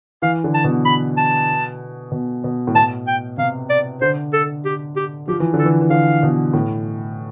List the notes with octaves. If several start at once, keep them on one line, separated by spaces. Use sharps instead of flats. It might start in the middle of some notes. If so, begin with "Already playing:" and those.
E3 F5
D3
A5
B2
B5
A5
B2
B2
A2
B2 A5
G5
C3 F5
D5
D3 C5
A4
G4
G4
F3 G4
E3
D3
A4
E3
E3
D3 F5
B2
A2